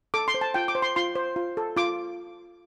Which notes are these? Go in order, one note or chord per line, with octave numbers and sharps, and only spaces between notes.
A4 D6
C6
C5
A5
F4 G5
D6
C5
C6
F4 C6
C5
F4
A4
F4 D6